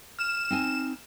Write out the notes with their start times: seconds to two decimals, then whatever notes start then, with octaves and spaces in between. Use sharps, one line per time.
0.19 F6 E7
0.50 C4 D#4 G#5